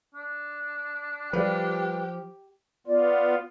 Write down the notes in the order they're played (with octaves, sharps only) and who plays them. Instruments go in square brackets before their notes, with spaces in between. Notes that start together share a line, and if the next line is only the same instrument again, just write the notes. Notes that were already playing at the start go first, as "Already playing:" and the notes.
[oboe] D4
[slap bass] F3 [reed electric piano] G3 F4 B4 [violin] G4
[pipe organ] B3 F4 [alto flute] D5